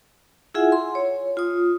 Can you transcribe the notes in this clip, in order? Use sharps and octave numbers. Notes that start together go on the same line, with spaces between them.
E4 F4 G#4 E5 F#5 G#5
C6
C#5
F4 D#6